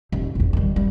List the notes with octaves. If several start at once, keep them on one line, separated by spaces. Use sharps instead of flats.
D#1 D#4
A#1 E2
D#3 G3
G3